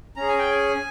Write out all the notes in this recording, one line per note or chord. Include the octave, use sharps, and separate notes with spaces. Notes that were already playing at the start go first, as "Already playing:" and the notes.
C#4 G#4 A#5
G#5
G5
G#5